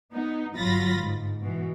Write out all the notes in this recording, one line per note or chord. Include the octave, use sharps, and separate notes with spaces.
B3 D#4
G1 F#3 F4 B5 A6 A#6
G#2
B2 E3